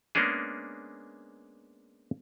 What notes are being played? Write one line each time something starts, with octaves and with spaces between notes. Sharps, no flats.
G#3 A#3 B3 C#4 D4 G#4